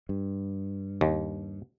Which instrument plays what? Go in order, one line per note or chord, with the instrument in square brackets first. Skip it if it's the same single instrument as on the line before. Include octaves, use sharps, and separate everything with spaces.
[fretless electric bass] G2
[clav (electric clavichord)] D#2